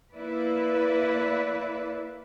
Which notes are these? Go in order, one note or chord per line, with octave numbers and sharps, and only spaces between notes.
A#3 E4 B4 D5